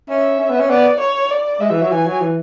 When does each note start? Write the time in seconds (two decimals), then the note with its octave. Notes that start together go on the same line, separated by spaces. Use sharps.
0.09 C#4 E5
0.39 C#4
0.50 B3
0.60 C#4
0.70 B3 D5
1.00 C#5
1.31 D5
1.61 G#3 E5
1.71 E3
1.81 F#3
1.91 E3 G#5
2.06 F#3
2.21 E3